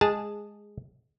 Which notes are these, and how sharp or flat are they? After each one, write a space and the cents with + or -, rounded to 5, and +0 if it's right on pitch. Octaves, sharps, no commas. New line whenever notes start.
G#3 +0 G#4 -10 A5 +0